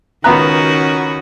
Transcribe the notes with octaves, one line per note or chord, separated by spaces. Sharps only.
C#2 D#3 B3 C#4 F#4 A#5 B5 F#6